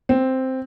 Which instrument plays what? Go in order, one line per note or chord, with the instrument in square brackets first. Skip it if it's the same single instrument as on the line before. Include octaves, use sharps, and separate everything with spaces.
[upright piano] C4